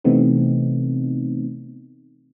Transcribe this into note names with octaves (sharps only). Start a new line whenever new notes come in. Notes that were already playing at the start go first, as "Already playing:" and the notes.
C3 E3 A3 B3 C4 D#4